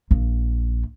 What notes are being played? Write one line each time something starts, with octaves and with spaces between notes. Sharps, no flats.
A#1